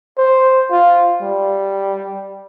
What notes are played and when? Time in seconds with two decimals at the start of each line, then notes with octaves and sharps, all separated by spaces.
0.18 C5
0.71 F4
1.22 G3